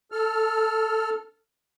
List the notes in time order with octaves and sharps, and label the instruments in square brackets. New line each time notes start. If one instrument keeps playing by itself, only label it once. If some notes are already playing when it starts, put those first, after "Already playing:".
[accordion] A4 F6